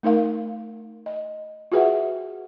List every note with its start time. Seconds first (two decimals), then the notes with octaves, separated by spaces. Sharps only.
0.03 A3 D#4 A#4 F5
1.06 D#5
1.72 F4 F#4 G#4 B4 E5 F#5